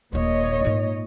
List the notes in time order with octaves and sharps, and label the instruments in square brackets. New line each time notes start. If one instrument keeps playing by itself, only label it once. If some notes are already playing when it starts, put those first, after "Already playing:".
[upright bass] D#1 D#2 [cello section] A#2 C#5 D#5
[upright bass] G#2 F4